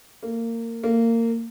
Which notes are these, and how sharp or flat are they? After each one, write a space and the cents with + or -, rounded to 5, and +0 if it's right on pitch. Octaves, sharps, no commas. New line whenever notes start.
A#3 -25
A#3 -25